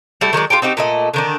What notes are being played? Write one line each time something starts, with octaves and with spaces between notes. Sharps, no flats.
G3 A3 E4 A4
D#3 F#3 G#3 D4
F4 G4 A4 G5
C4 D#4 F#4 G4
A#2 A3 D#5
D3 D#3 D4